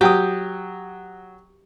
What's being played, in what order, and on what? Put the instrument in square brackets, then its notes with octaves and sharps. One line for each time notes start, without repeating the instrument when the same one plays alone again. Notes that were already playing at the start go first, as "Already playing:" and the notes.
[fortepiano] F#3 G5 D#6 [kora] G4